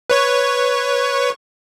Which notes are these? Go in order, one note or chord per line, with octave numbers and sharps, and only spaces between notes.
B4 C#5 C#6